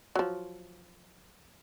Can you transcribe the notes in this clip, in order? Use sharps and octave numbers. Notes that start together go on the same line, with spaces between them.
F3 F#3